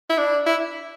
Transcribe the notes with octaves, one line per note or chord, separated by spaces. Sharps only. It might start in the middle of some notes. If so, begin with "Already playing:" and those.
E4
D4
E4